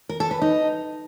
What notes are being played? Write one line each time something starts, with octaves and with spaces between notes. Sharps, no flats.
A#4
A4
B4
D#4